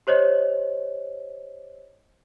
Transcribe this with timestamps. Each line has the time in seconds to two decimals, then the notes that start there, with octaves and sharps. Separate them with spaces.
0.07 G4 C5 C#5 D#5